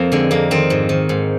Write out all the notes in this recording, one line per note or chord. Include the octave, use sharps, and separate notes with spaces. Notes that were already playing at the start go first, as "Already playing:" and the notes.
Already playing: F2 A#3 C4
D3 G#3
F2 A#3
D#3 C4
G#2
D#3
G#2